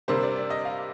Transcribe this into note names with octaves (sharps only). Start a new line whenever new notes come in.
C3 G3 A#3 D4 C5
D5
D5
D#5
F5